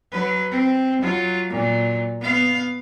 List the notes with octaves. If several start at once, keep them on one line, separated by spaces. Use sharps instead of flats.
F#3 B4
C4
F#3 F4
A#2 F#3
B3 F5